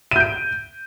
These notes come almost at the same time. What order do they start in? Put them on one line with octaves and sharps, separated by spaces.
D#7 G6 D7